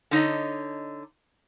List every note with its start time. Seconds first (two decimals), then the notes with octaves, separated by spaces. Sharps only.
0.11 D3 D#4 C#5 D#5